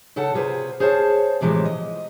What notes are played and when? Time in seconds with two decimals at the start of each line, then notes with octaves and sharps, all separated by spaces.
0.16 C#3 A4 F#5 A5
0.34 C3 F4 G#4 B4 C5
0.80 G#4 C5 C#5 F5 A5
1.41 A2 C3 E3 F3 G#3
1.65 D#5